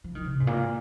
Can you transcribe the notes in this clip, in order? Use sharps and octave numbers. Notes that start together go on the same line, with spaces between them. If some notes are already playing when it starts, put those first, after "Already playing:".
F3
D#3
C3
G#2
A#2